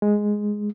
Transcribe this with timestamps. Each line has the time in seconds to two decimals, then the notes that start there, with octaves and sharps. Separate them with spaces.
0.02 G#3